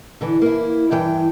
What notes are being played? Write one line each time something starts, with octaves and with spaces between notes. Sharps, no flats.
D3 E3
A#3 E4
G2 E3 G5